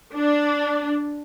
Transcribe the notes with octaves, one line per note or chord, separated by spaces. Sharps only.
D4